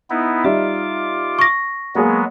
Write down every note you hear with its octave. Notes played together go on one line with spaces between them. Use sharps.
B3 D#4 E4
G3 D#4 F4 E5 D6
C#6 A#6
F#3 G#3 A#3 B3 G#4